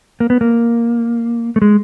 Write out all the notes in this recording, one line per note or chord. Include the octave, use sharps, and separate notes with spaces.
A#3
B3
A#3
A3
G#3